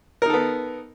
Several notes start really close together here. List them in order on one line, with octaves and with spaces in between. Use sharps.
A#4 D#4 A4 B3